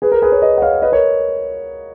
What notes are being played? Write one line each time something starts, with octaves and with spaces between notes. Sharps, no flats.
G#4 B4
A#4
G#4 B4
A#4 C#5
B4 D#5
F#5
C#5 F5
B4 D#5
A#4 C#5